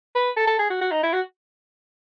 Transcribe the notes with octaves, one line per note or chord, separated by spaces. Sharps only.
B4
A4
A4
G#4
F#4
F#4
D#4
E4
F#4